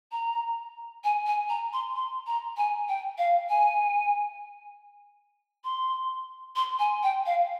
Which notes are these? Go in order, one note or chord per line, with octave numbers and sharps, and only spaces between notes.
A#5
G#5
G#5
A#5
C6
C6
A#5
G#5
G5
F5
G#5
C6
C6
G#5
G5
F5